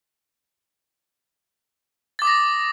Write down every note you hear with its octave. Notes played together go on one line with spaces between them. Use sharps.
D6 D#6 A6 A#6